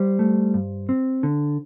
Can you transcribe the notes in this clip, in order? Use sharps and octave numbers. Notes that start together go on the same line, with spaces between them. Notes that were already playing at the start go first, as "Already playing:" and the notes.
Already playing: G3 C5
A3
G2
C4
D3